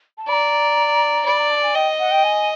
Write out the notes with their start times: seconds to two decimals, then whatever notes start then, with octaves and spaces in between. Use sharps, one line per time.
0.18 A5
0.28 D5 A#5 B5
1.25 D5 B5
1.38 A#5
1.50 A5
1.62 G#5
1.74 D#5 G5
1.99 F#5
2.11 G5
2.23 G#5